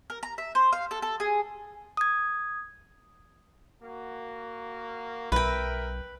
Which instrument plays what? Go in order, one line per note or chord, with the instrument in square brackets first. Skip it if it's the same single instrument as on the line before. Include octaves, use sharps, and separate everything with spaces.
[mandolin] A#4
A#5
E5
C5
F5
A4
A4
G#4
[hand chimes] D#6 G#6
[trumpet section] A#3 F#4
[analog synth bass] B1 [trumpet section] A#4 E5 [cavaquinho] B4 G5